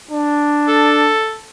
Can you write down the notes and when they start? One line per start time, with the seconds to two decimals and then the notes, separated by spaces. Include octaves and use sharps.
0.11 D4
0.68 A4